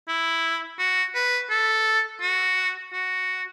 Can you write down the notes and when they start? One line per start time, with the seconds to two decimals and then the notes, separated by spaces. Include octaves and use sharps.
0.08 E4
0.79 F#4
1.15 B4
1.50 A4
2.21 F#4
2.93 F#4